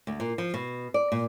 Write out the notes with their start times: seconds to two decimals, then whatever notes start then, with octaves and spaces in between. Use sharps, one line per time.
0.07 D2
0.20 A#2
0.38 F3
0.54 B2
0.94 D5
1.12 A#2